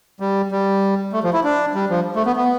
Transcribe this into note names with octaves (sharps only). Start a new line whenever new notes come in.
G3
G3
A3
F3
E4
D4
G3
F3
A3
B3
B3